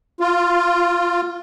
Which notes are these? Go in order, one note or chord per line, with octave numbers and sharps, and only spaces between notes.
F4